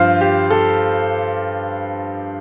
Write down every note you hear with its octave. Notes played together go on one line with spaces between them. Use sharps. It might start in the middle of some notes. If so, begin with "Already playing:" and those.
Already playing: G2 F3 F4 C5
G4
A4